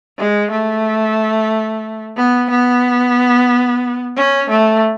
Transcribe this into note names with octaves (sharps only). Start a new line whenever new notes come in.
G#3
A3
B3
B3
C#4
A3